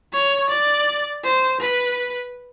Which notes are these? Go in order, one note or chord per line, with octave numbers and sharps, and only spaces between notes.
C#5
D5
C5
B4